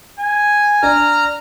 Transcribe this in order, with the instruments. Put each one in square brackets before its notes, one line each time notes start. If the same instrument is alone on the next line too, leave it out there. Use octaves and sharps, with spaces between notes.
[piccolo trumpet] G#5
[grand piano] D4 D5 [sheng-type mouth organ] A#5 F6